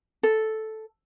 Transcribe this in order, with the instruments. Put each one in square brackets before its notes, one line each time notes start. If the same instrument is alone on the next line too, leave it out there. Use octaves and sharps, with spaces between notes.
[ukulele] A4